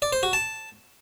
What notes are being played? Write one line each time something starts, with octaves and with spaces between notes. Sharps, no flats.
D5
C5
F#4
A5